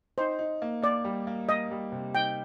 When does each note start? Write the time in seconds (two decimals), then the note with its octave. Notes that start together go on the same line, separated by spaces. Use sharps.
0.18 D#4 C5
0.39 D#4
0.62 A#3
0.82 A#3 D5
1.04 G3
1.27 A#3
1.49 A#3 D#5
1.71 G3
1.92 C3
2.14 D#4 G5